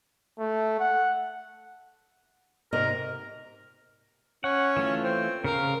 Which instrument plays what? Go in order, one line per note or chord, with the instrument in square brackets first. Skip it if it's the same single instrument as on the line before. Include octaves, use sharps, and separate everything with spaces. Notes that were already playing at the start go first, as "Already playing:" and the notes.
[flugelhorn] A3
F#5
[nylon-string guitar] G#2 C3 D#5 [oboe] A#4
[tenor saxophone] C#4 [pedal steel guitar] F#5
[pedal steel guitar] E3 A3 F4
[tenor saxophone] C4
[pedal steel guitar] C#3 F5 [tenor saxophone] A#4